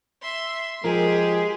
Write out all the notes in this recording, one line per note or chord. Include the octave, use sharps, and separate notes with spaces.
E5 C6
F3 G#3 G4 G#4 A#4